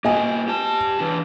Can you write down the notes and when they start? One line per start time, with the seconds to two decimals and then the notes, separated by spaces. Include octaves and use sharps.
0.05 A#3 F#4 D#5 G#5
0.48 G4 A5
1.00 E3 D4